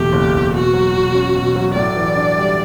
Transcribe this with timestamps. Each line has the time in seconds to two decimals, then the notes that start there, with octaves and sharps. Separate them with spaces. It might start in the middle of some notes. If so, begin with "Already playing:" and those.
Already playing: F#1 E2 B2 A3 G4
0.12 F#1
0.33 E2
0.54 B2 F#4
0.73 F#3
0.95 B2
1.14 C#4
1.35 B2
1.56 F#3
1.75 A2 D5
1.96 E3
2.16 D4
2.37 G3